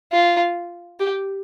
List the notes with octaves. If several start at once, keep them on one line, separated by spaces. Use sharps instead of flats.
F4
G4